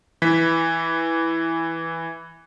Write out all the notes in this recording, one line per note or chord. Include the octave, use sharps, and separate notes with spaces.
E3 B6